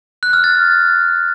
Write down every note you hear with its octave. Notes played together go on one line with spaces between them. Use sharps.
F#6
F6
A6